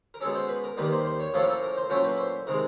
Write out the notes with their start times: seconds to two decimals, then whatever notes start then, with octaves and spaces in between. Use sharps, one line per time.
0.14 A#4
0.21 B2 G#3 C#4 A4
0.35 C5
0.49 B4
0.64 A#4
0.77 D#2 D#3 G3 A#3 B4
0.92 C5
1.06 C5
1.20 C#5
1.34 A2 F3 A#3 C#4 E4 A4
1.49 A4
1.63 A#4
1.77 C5
1.90 A#2 F#3 A3 C#4 E4 C5
2.04 B4
2.18 C5
2.47 C3 D#3 G#3 A#4